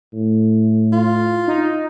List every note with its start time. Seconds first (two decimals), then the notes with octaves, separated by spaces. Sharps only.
0.14 A2
0.93 F4
1.48 D#4